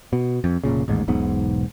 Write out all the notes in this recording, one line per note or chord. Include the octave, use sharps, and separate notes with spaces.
B2
F2
F1 A#1 A#2 C#3
A1 D#2 G#2
E1 B1 G#2 B3